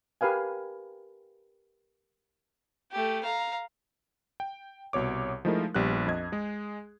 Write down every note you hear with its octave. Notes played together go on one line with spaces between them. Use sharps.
G4 A#4 B4 F5 G#5
A3 G4
F5 A#5
G5
C2 B2 C#5 D6
F3 G#3 A3 D#4 E4 A#4
A#1 G3 B3 F#6
F2 D#5 G#6
G#3 G#4